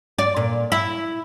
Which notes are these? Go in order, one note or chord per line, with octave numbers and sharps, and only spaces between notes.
D5
A#2
E4